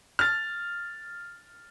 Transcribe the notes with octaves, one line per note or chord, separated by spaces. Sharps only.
F6 A6